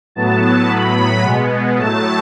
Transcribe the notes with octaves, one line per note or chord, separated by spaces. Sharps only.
A2 F#3 B3 A5
A2 F#3 B3 B5
B2 G#3 B3
A2 F#3 A3 A5